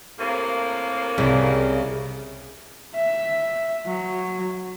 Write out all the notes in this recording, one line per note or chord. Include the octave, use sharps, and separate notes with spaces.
A2 C3 A#3
C2 C#3
E5
F#3